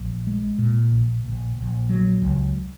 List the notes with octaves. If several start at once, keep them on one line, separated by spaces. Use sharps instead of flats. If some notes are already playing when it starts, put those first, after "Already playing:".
Already playing: A#1
G#3
A#2
A#1
A#1
A#1
F#3
C#2